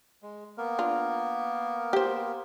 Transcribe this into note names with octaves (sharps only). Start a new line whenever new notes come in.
G#3
A#3 B3 A#4
D4 F4
G4 C5